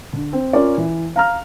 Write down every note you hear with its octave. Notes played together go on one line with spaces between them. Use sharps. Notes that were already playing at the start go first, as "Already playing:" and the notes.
D3
C4
C#4 F4 A#4 C#5 D5
E3
F5 A#5 F6